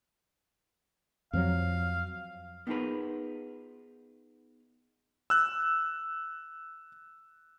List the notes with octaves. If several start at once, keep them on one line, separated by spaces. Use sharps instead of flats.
F2 F3 F#3 F5
B3 D#4 F4 G#4 A#4 B4
E6 F#6